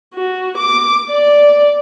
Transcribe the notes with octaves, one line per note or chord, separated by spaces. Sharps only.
F#4
D6
D5